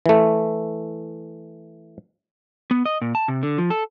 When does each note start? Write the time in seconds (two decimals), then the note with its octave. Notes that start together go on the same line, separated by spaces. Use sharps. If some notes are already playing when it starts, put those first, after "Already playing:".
0.06 E3 A3
2.71 B3
2.86 D#5
3.01 A#2
3.15 A5
3.28 C3
3.43 D3
3.58 F3
3.70 A4